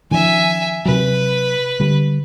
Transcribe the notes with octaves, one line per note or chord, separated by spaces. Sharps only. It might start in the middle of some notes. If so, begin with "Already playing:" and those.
D#3 F3 C#4 E5 G#5
C3 F#3 B4
D3 G3